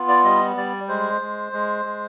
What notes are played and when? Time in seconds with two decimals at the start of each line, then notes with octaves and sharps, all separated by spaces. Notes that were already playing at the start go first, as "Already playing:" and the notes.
Already playing: B3 F4
0.08 D5
0.25 G3 D#5
0.56 G3 D5
0.89 G#3 C5
1.21 G#3
1.53 G#3
1.85 G#3